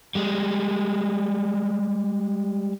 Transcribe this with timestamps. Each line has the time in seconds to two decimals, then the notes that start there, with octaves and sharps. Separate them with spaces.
0.15 G3 G#3